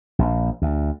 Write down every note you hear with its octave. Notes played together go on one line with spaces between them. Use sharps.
A#1
D2